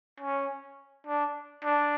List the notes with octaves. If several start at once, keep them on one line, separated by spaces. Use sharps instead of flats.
C#4
D4
D4